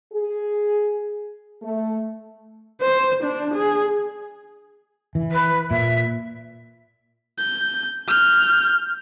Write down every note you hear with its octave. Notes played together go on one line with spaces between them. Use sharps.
G#4
A3
C5
D4
G#4
E3
B4
A#2 E5
G6
F6 G6